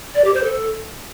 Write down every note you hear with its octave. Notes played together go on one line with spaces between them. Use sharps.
D5
G4
C5
A4